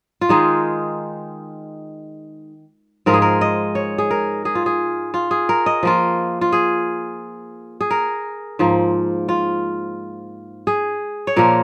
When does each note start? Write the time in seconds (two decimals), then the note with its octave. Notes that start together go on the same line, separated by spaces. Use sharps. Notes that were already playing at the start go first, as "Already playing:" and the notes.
0.21 F4
0.29 D#3 G#3 D#4 G#4
3.06 G#2 F3 G#3 F4 A#4
3.14 G#4
3.22 A#4
3.41 D#5
3.75 C#5
3.98 G#4
4.11 A#4
4.45 G#4
4.55 F4
4.66 G#4
5.14 F4
5.31 G#4
5.49 A#4
5.66 D#5
5.83 F3 A#3 F4
6.41 F4
6.52 G#4
7.81 G#4
7.91 A#4
8.59 G#2 F3 A#3
9.29 F4
10.67 G#4
11.27 C#5
11.36 A#2 F3 A#3 A#4